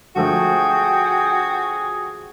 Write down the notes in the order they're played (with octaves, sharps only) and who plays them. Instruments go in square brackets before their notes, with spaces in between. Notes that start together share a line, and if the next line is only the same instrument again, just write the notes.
[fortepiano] D3 F3 A3 [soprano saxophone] F#4 [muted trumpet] G#4 [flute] G5